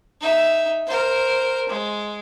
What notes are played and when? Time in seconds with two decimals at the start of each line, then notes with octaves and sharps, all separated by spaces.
0.21 D#4 E5
0.87 A#4 C5
1.69 G#3